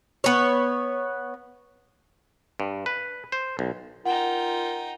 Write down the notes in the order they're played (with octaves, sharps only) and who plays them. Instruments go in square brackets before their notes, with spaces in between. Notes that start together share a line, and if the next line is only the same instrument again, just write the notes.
[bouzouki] B3 C#5
[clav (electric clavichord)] G2
B4
C5
B1
[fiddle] D#4 G5 [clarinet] F4 [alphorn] A#4 [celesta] F#5